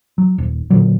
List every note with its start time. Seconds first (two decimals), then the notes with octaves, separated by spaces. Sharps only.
0.18 F#3
0.38 D#1
0.70 A#2 D3 F#3